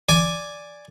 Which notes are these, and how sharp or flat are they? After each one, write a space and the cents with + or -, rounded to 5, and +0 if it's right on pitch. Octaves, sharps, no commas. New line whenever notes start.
D5 +0 G#5 +0